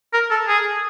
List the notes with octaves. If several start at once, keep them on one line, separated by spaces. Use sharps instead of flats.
A#4
A4
G#4